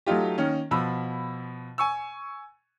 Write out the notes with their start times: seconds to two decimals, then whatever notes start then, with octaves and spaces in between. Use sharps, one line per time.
0.07 F#3 A3 D#4 F4 G4
0.38 D#3 A#3 C#4
0.71 B2 F3 B5 E6
1.78 G#5 C#6 E6